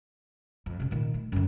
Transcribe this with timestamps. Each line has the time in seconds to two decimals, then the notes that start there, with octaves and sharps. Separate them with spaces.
0.66 F2
0.80 F#2 C3
0.91 A#2 D#3
1.14 A3
1.32 F#2 D3